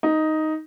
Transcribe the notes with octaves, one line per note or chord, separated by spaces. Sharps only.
D#4